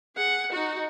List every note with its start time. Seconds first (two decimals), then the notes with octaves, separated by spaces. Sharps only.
0.15 G#4 F#5
0.52 D#4 F#4